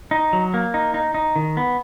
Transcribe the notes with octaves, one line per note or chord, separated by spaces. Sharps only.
D#4
F#3
A#3
D#4
D#4
D#4
D#3
B3